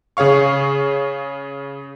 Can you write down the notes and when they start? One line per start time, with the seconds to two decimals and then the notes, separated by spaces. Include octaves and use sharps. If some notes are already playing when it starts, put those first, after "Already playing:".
0.17 C#3 G#4 C#5 F5 C#6